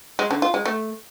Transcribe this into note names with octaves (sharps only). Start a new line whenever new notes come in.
G#3
D3
F4
G#3
A3